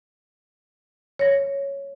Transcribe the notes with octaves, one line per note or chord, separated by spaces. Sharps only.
C#5 A#6